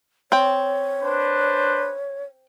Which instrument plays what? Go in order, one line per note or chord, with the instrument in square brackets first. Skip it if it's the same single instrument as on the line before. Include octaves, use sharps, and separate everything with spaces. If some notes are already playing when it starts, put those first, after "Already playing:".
[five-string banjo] C4 G5 [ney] C#5
[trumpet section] D4 B4 C5